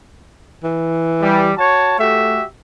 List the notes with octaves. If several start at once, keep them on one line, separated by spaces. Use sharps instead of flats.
E3
G3
F#4 C#5 A5
A3 F#4 G4 E5